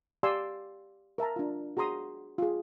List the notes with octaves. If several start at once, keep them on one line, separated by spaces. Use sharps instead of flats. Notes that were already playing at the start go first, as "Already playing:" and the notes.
G4 D5 F5 G#5 C6 E6
A#4 E5 A5 A#5
D4 F4
F#4 G#4 A#5 C6 D#6
F4 G#4